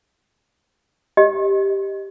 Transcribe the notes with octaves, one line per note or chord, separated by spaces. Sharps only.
G4 D#5